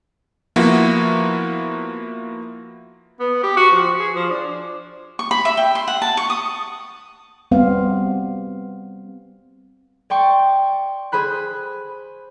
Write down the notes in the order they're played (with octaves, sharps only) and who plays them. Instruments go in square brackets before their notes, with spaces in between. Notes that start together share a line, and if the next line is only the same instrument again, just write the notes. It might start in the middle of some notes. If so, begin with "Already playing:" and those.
[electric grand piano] F3 A#3 B3 E4 F#4
[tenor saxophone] B3
G4
F#4
F3
G#4
F3
D4
[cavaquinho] C#6
B5
E5
G5
C6
F#5
A5
C#6
D#6
[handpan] G3 B3 C4 C5 F5
[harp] D5 G5 C6 C#6
G#4 C5 B5 F#6